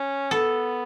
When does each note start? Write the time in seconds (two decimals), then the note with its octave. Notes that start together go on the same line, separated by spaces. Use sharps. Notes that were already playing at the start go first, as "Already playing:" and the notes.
Already playing: C#4
0.31 B3 A4